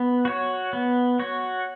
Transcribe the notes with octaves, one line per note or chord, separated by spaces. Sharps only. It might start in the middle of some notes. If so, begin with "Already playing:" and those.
Already playing: B3
F#4 C#5
B3
F#4 C#5